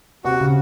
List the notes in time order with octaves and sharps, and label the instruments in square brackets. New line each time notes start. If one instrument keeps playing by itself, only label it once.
[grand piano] C3 [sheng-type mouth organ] F#4
[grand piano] C#3